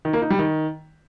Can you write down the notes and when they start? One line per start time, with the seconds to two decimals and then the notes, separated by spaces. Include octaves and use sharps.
0.05 D#3
0.13 A#3
0.22 D#4
0.30 G3
0.39 D#3